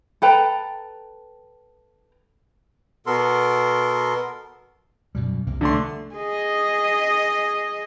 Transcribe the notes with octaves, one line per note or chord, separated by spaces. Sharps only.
A4 B4 G5 A#5
B2 B3 A4 A#4 C6
F#2 B2 G3
C2 C3 A#3
D3 A3 C6
G#4 D#5